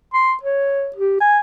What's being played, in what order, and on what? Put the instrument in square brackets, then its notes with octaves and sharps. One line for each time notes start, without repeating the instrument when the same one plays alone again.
[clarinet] C6
C#5
G4
G#5